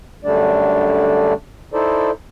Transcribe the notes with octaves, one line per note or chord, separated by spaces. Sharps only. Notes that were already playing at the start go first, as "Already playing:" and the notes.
F#2 D3 G3 A3 D4 D5
D#4 E4 A4 C5 D5